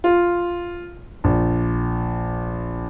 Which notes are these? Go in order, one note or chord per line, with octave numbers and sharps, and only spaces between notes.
F4
A#1